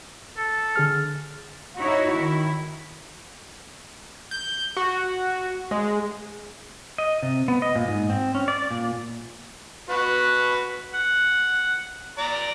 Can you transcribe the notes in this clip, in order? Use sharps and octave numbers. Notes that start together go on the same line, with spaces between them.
A4
D3 G#4 F6
D#4 E4 F#4 C#5
D#3 E4
G6
F#4
G#3
D#5
C3
B3
D#5
A#2
G#2
C4
C#4
D5
A#2
F#4 B4
F#5
D5 A#5